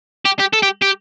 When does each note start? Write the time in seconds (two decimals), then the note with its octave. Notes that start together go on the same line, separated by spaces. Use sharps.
0.25 G4
0.39 G4
0.53 A4
0.62 G4
0.82 G4